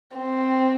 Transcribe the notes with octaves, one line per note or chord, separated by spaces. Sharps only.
C4